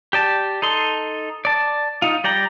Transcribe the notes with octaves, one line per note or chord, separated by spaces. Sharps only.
G4 D5 A5
D#4 A4 C6
D5 A5
D#4 F4
G3 D5 G5 A#5